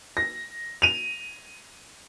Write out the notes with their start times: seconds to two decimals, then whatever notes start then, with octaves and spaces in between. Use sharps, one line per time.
0.17 A#6
0.82 D#7 F7